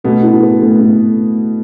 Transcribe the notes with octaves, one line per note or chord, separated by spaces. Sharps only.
B2 A3 B3
E4
B4
A3
A3